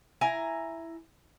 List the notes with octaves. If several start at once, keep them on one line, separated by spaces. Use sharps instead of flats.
E4 G#5 A#5